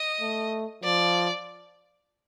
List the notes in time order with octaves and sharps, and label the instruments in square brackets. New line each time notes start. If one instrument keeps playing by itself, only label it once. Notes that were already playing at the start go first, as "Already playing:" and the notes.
Already playing: [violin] D#5
[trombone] A3
[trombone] F3 [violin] D5